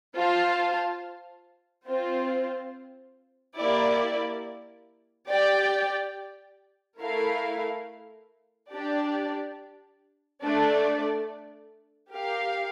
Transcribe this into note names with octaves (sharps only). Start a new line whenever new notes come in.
F4 C5 F5 A5
C4 F4 C5
A#3 E4 G4 D5
G4 D5 G5
A3 E4 A#4 F5
D4 G4 D5
A3 D4 A4 D5
G4 A#4 F5